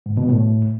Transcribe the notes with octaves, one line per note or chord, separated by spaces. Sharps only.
G#2
B2
A2